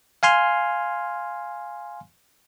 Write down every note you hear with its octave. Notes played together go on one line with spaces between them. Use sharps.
F5 G#5 C6 F6